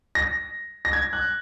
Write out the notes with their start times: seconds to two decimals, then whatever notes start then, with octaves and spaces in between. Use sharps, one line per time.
0.15 A#6
0.85 A#6
0.93 G#6
1.13 F#6